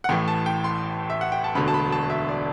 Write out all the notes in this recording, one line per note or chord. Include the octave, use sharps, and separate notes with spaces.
F#5
A1 A2 E3 G5
A5
G5
C6
E5
F#5
G5
A5
E1 D2 D3 B5
A5
B5
A5
E5
D5